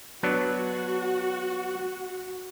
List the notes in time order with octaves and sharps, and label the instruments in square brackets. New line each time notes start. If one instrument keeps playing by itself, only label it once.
[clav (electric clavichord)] F#3 B3 D4 [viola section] F#4